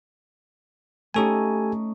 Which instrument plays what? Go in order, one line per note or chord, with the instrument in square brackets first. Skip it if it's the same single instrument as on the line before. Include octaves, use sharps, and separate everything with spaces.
[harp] A3 C#4 D#4 [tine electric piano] G4 A4 G#5